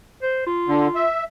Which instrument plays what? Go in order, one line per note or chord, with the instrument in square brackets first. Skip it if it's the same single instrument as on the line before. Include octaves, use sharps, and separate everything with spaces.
[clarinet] C5
F4
[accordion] D3
E5